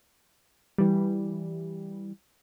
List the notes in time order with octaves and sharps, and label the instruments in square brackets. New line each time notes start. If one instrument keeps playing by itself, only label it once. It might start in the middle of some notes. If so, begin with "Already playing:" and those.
[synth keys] E3 G3